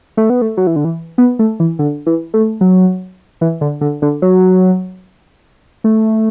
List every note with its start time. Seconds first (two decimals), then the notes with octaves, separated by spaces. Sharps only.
0.17 A3
0.30 B3
0.42 A3
0.57 F#3
0.67 E3
0.76 D3
0.85 E3
1.18 B3
1.39 A3
1.60 E3
1.79 D3
2.06 E3
2.34 A3
2.61 F#3
3.41 E3
3.61 D3
3.81 D3
4.02 D3
4.22 F#3
5.84 A3